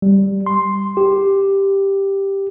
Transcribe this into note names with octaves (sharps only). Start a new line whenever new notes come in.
G3
C6
G4